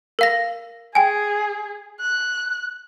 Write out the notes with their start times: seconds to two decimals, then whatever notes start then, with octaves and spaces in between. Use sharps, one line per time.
0.19 A#4 F5 A#6
0.95 G#4 G5 G#5
2.00 F#6